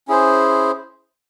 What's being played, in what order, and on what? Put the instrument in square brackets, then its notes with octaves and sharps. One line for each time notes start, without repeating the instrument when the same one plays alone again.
[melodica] C#4 E4 G#4 C5